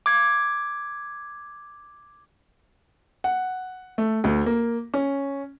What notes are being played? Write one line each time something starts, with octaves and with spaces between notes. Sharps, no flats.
D6 G#6
F#5
A3
D2
A#3
C#4